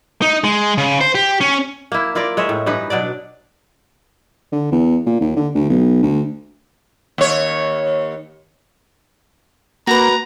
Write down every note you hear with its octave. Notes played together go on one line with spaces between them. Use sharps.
D#4
G#3
C#3
C5
G4
C#4
A#3 E4
E4 F4 A#4 D5
G#3 C#5 D#5 E5
A2
G2 E3 D#4 B4
B2 F#3 D4 D5
D3
E2
A#2
D#2
D3
D2
B1
D2
D#2 C#5
A#3 F#4 B4 A#5